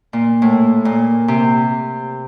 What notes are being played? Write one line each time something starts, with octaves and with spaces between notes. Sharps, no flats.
A#2
A2
A#2
C3